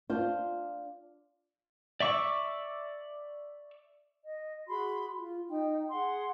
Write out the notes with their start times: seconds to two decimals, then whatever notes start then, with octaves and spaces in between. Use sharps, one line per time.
0.10 D4 F4 C5
2.00 D5 E5 C#6 D6 E6
4.26 D#5
4.69 F#4 G#4 B5 C6
5.18 F4
5.48 D#4 G5
5.91 G#4 F#5 C6